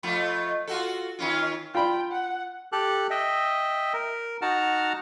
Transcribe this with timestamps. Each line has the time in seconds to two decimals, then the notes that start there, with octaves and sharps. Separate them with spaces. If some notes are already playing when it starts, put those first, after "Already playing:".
0.03 F2 A3 F4
0.68 F4 F#4 A4
1.19 D#3 C#4 F4
1.75 F4 G5 B5
2.12 F#5
2.72 G4 A4 F#6
3.10 D#5 E5 G5
3.94 A#4
4.42 D#4 F#4 F#5 A5 A#5 F6